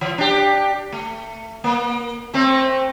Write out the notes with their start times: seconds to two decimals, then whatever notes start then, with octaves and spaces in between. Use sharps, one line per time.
0.01 E3
0.18 D4 G4
0.92 A3
1.64 A#3
2.34 A3 C4